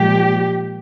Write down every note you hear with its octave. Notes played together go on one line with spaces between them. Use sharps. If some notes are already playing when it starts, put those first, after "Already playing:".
Already playing: A#2 F3 G#3 G4